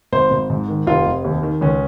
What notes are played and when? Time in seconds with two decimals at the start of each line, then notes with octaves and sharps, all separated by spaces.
0.12 G#1 C5
0.31 G#1
0.50 G#2
0.68 D#3
0.87 F1 F4
1.06 F1
1.24 D#2
1.43 D#3
1.61 C#2 C#4